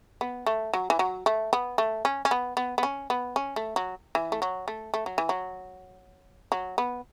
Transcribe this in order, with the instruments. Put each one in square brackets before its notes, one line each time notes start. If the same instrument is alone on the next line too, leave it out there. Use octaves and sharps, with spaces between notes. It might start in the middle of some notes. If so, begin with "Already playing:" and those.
[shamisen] B3
A3
F#3
E3
F#3
A3
B3
A3
C#4
C#4
B3
B3
B3
C#4
B3
C#4
A3
F#3
E3
A3
F#3
A3
A3
F#3
E3
F#3
F#3
B3